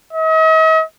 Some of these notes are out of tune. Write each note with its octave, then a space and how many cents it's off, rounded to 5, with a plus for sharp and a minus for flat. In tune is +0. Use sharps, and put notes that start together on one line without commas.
D#5 +45